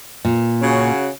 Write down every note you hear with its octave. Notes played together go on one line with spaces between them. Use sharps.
A#2
C#3 C#4 F#4